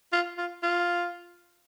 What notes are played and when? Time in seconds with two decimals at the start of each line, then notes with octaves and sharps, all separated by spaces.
0.13 F4
0.38 F4
0.63 F4